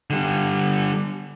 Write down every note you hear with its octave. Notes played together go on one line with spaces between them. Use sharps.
D3 G3